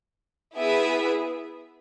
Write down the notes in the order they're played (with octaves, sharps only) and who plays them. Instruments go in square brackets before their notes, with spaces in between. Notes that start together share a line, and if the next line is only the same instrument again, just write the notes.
[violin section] B3 E4 G#4 B4 E5